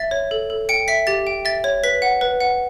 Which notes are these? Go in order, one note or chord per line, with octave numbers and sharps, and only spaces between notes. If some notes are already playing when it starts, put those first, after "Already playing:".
Already playing: E5 A6
C#5
A4
A4
G5 C#7
E5 B6
G4 A6
G5
E5 A6
C#5
B4 B6
F#5
B4
F#5